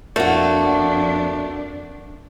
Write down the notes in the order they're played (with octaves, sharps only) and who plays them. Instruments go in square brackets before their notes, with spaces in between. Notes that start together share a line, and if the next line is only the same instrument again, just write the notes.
[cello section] F2 D4 [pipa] A3 [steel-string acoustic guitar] A#3 F#4